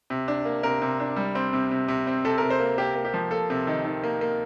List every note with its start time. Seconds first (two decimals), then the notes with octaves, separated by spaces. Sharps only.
0.10 C3
0.28 D4
0.45 A#3
0.63 C3 A#4
0.82 C3
1.00 D4
1.16 G3
1.35 C4
1.53 C3
1.71 C3
1.88 C3
2.07 C4
2.25 C3 A4
2.38 C3 A#4
2.50 C5
2.60 A#3
2.78 A#3 G4
2.95 A#3
3.05 G4
3.14 F3
3.31 A#3 A4
3.50 C3
3.67 D#3
3.85 D#3
4.04 A#3
4.21 A#3